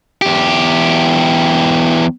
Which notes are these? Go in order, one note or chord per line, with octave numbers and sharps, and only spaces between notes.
E2 G4